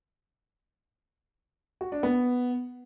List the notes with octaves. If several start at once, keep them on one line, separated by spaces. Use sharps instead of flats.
F#4
D4
B3